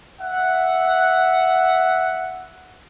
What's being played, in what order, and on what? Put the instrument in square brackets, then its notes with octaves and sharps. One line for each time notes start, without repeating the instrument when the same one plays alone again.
[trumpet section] E5 F#5